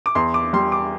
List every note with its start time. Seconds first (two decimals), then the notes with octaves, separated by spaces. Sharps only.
0.06 D6
0.15 E2 C6
0.34 D6
0.53 G3 C6
0.72 D6